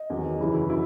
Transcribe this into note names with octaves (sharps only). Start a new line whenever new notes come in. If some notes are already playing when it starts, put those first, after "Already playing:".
Already playing: D#5
E2 D#3 F#3
F#2 C#3 E3 E4
E4
F#3 E4